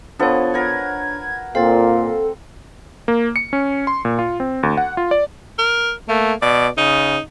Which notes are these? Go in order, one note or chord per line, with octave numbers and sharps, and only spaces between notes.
F3 B3 D4 A4 C#5
A#4 B4 F#5 G#6
A#2 C4 A4 F5 A6
A#3
C#7
C#4
C6
A#2
F4
C4
D2
F#5
F4
D5
A#4
A3 A#3
B2 D5
C#3 D#4